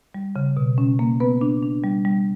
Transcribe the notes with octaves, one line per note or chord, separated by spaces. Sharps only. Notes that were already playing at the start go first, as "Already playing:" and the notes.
G3
C#3
B2
C#4
A#3
B3 B4
D4
D4
G3
G3